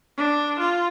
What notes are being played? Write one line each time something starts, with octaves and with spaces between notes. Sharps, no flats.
D4
F4